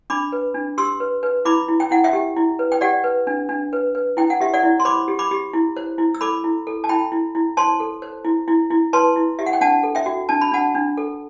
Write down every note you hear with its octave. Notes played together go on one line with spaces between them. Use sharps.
D4 B5 D6
B4
D4
G4 C6 E6
B4
B4
E4 B5 D6
E4
G5
E4 F#5
E5 G5
G4
E4
B4
G5
G4 D5 F#5
B4
D4
D4
B4
B4
E4 G5
F#5
G4 E5
D5 F#5
E4
C6
C5 B5 D6
G4
B5 D6
G4
E4
C5
E4
E6
A4 B5 D6
E4
A4
A5
E4 G5 B5
E4
E4
C5 A5 C6
A4
C5
E4
E4
E4
B4 A5 C6
E4
G4 E5
F#5
G5
D4 F#5 A5
A4
E5 G5
F#4
D4 A5
B5
D4 F#5 A5
D4
A4